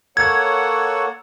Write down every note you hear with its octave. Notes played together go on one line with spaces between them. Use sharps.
A#3 A4 C#5 F#5 G#6